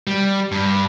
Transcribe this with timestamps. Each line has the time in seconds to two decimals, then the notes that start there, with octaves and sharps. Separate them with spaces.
0.07 G3
0.52 G2